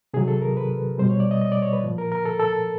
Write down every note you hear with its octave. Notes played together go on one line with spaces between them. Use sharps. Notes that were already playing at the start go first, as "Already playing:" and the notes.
C3 D#3 F#3 G#4
A4
A#4
B4
B2 G3 C5
C#5
D5
D#5
D#5
D5
C#5
B4
A#2 F3
A#4
A#4
A4
A4